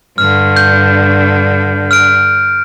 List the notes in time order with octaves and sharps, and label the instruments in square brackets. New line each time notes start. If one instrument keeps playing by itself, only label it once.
[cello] G2 D3 [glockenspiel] F6
[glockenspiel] G6
F6 D7